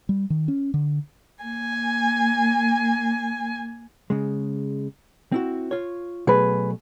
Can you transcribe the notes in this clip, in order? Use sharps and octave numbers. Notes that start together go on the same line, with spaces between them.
G3
D#3
C#4
D3
A#3 G#5
C#3 G#3
C4 E4 F#4
F4 C#5
B2 F#3 A3 G#4 B4